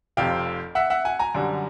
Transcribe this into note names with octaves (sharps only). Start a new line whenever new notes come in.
F1 F2 C3 F5 G5
E5 F#5
E5 F#5
F#5 G#5
G#5 A#5
F#2 D3 G3